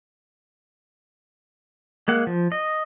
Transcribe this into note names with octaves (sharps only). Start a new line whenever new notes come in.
G#3 A#3 F#5
F3
D#5